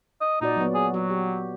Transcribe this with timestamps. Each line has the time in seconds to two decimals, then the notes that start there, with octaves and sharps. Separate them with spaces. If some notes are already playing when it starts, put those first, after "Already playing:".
0.21 D#5
0.41 A#2 D#4 F#4 D5
0.57 F#3 B3
0.75 G#4
0.94 F#3 F#4
1.10 G4